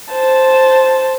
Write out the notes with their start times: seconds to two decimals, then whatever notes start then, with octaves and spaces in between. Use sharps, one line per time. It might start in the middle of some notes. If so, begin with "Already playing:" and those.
0.12 C5 A5